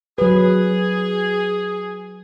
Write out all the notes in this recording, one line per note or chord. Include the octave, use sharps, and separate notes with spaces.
F#3 G#4 B4